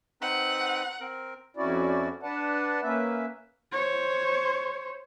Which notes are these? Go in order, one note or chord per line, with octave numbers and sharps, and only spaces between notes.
C4 D#4 B4 F#5
C4 A#4
F2 C#4 E4 F#4 D5
D4 B4 D5 F#5 A5
A#3 C#4 B4 E5
C5 C#5